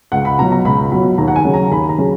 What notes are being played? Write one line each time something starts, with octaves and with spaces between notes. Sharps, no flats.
C#2 F#5
B5
B2 F#3 A#5
A#5
C#2 B5
B2 F#3 B5
D#2 A#5
F#5
G#5
C#3 F#3 C#4
A#5
D#2 B5
A#5
C#3 F#3 C#4